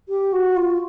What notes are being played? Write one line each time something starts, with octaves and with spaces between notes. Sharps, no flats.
G4
F#4
F4